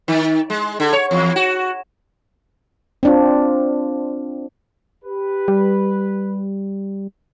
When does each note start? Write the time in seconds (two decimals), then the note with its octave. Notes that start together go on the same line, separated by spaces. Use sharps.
0.08 D#3
0.50 G#3
0.80 D3
0.93 C#5
1.11 E2
1.36 F#4
3.03 C4 D4 F4
5.05 G4 B4
5.48 G3